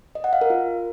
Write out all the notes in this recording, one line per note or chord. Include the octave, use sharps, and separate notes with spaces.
D#5
F#5
F5
A#4
F4